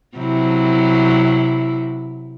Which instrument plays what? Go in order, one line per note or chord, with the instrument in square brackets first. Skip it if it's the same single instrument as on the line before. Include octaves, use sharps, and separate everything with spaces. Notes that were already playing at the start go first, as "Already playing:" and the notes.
[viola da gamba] C3 F#3 E4